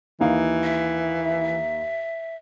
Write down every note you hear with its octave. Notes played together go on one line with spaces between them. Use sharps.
D#2 E3 D#4 F5
E5